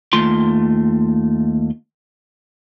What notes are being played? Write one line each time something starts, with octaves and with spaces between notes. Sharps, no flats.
D#2 A3 F4 C6